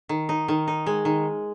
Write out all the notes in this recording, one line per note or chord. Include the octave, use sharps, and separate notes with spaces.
D#3
D#4
D#3
D#4
G#3
D#3